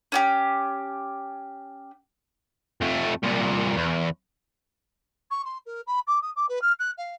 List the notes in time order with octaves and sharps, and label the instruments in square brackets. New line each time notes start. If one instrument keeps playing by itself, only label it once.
[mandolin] C#4 F#4 G4
[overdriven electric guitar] F2 A3
C2 A#2
E2
[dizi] C#6
C6
A#4
B5
D6
D#6
D6
B4
F6
F#6
F5